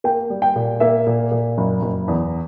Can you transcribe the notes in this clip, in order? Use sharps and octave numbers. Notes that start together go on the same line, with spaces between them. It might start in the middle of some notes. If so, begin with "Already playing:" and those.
A#3 G5
G3
G5
A#2
A#3 E5
A#2
A#2
F#1
F#1
E2